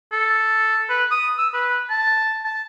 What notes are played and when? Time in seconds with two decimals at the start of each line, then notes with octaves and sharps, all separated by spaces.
0.12 A4
0.89 B4
1.11 D#6
1.38 E6
1.54 B4
1.90 A5
2.45 A5